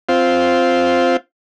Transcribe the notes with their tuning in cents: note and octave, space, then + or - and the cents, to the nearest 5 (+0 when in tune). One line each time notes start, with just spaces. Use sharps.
C4 +0 F4 +0